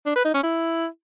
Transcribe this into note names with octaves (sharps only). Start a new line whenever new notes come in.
D4
B4
D#4
C#4
E4